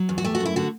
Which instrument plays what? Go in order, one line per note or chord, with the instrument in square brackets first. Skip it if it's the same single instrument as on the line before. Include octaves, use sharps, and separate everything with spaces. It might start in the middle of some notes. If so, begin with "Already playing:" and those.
Already playing: [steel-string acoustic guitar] F#3
E2
F#4
A3 G4
F#4
F#2
E4
D3 F#4